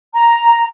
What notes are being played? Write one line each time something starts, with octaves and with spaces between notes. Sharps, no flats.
A#5